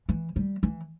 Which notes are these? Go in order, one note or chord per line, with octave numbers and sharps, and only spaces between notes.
E3
G3
E3